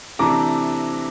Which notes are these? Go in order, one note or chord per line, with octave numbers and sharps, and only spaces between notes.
C3 E3 A3 D4 A#5 D6